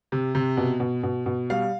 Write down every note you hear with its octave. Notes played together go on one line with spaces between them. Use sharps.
C3
C3
B2
B2
B2
B2
G3 F5